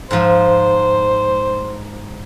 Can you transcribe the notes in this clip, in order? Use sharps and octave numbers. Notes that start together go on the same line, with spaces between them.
G#2 F3 C5